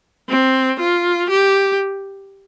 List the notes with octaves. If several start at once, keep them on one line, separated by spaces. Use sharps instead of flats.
C4
F4
G4